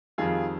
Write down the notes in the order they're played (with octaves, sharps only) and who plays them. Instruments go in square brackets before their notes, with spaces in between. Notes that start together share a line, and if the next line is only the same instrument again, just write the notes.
[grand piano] F2 D#3 G3 F4 G#4